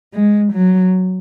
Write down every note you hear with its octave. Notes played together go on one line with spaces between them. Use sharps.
G#3
F#3